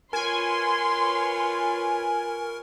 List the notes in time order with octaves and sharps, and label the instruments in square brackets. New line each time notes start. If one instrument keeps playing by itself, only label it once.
[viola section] F4 B4 C#5 [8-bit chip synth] A#4 [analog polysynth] G#5 [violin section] C6